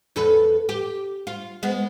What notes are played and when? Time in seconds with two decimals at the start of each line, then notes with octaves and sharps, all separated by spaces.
0.16 E2 A4 B4
0.69 G4
1.27 F4
1.63 G#3 B3